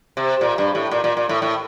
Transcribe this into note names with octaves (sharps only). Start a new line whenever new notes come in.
C3
A#2
G2
A2
A#2
A#2
A#2
A2
A2